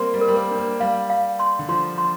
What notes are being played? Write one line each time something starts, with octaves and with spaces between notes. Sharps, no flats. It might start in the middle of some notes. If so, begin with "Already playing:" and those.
Already playing: G3 A#3 C4 C6
G3
A#4
G3
A#3
D4
A#3
G3 F5
F5
C6
D3
F3 C6
C6